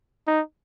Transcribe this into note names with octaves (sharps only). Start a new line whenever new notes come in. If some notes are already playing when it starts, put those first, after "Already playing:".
D#4